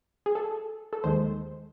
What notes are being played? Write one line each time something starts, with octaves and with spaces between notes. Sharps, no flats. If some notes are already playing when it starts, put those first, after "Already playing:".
G#4
A4
A4
D#2 D#3 G#3 C5